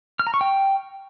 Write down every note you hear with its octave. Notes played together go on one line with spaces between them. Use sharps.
F6
A#5
C#6
G5